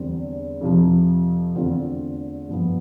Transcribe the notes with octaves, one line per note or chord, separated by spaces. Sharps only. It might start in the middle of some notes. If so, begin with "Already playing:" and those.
Already playing: E2 D3 G3 C4
F2 C3 F3
E2 D3 A3 C4 F4
G2 F3 B3